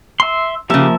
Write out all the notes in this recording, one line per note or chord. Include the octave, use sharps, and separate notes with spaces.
E5 C6
C#3 F3 A#3 G4 E5